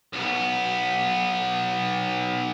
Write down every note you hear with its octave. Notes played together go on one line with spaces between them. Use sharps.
B1 B3